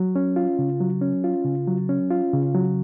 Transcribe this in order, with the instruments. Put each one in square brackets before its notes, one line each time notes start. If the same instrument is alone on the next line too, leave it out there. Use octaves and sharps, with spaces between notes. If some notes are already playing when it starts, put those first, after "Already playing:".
Already playing: [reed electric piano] F#3
C#4
F4
C#3
F#3
C#4
F4
C#3
F#3
C#4
F4
C#3
F#3